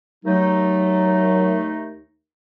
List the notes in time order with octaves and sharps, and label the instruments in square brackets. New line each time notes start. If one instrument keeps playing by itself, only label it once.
[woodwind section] D#2 A3 D#4 [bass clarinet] F#3